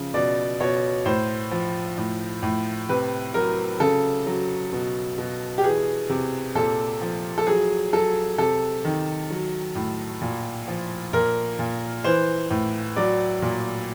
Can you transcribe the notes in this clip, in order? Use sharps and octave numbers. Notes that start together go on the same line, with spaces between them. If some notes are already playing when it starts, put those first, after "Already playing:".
Already playing: C#3 F3
B2 D5
B2 C#5
A2 C5
F3
A2
A2
C3 B4
F#3 A#4
C#3 A4
F#3
B2
B2
G4
E3 G#4
C3
A#2 A4
F3
A4
F#3 G#4
F#3 A4
C3 A4
D#3
F#3
A2
A#2
F3
A#2 A#4
A#2
E3 C5
A2
F#3 D5
A#2